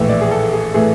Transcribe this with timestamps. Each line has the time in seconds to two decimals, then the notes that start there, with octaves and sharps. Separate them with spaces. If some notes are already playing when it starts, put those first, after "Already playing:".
Already playing: A#1 A2 E3 A3 E5
0.09 D5
0.21 G#4
0.31 A4
0.53 G#4
0.74 A2 E3 A3 G#4